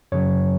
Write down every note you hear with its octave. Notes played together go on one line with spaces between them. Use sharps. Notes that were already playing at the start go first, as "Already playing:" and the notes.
F#2 C#3 F#3 C#5